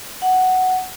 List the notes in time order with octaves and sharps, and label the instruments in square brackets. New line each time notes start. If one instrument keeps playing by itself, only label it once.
[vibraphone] F#5